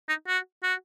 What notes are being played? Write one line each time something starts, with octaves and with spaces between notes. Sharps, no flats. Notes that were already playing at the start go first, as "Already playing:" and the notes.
D#4
F#4
F#4